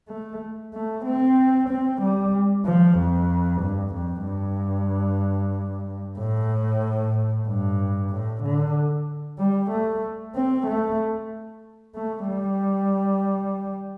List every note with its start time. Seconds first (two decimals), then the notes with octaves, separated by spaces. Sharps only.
0.09 A3
0.74 A3
1.05 C4
1.69 C4
2.02 G3
2.65 F3
2.98 F2
3.62 G2
3.94 F2
4.26 G2
6.19 A2
7.47 G2
8.11 A2
8.43 D3
9.39 G3
9.71 A3
10.36 C4
10.67 A3
11.95 A3
12.28 G3